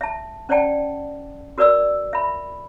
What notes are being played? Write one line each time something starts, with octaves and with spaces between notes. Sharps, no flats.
E5 A5
C#4 C5 D5 F#5 G5 A5
F#4 A#4 B4 D5 D#6 E6
E5 B5